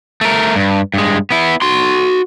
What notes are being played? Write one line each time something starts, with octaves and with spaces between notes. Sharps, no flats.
A3 A#4
G2
G2 G#3
B3 E4
F#4 C6